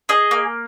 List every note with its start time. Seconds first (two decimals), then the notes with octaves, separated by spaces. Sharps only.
0.09 G#4 D#5
0.31 A#3